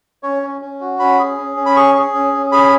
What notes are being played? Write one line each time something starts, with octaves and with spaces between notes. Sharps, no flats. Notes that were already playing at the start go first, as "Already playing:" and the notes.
C#4 C#5
C#4
C#4
F#4
C#4 B5
G#4
C#4
C#4
B5
G#4 C#6
G#4
C#4
C#4
G#4 B5